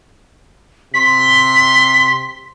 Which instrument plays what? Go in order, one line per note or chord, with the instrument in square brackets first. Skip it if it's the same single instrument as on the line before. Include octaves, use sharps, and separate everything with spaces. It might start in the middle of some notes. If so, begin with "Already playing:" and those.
[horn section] C3 C6 [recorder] B6